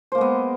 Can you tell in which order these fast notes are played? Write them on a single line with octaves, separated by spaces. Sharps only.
C5 A#3 G#3 B3